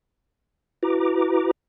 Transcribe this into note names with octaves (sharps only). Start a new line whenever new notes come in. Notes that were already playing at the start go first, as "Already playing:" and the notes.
E4 F#4 B4 A#5 D6